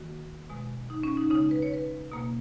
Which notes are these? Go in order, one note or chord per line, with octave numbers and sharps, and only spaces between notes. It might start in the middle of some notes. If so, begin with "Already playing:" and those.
Already playing: D#3 A#3 F#4
B2 G#3
D#4
C#4
D#4
C#3 G#3 D#4
B4
C#5
B4
B2 A#3